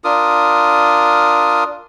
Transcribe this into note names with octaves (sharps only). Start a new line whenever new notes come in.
D4 F4 A#4 D#6